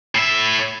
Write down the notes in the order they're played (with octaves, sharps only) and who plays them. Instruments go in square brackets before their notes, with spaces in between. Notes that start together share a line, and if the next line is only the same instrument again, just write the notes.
[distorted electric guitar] A2 E5